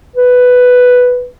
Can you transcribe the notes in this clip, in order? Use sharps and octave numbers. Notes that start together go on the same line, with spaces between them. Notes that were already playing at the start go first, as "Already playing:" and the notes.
B4